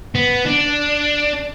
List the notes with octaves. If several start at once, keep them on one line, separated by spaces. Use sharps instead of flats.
B3
D4